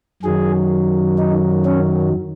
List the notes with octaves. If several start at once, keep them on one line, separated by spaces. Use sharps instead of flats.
F#2 D#3 F#3 G#4
D#4
C#4